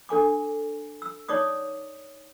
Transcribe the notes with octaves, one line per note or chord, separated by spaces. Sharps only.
D4 A4 G#5 D6
E6
D#4 C#5 D5 D6 D#6